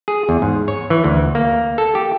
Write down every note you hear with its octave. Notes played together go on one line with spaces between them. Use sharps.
G#4
E2
G#2
C#5
E3
D2
A#3
A4
G4